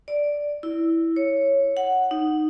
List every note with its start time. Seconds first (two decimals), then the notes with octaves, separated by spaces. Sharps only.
0.08 D5
0.63 E4
1.16 C#5
1.77 F#5
2.11 D#4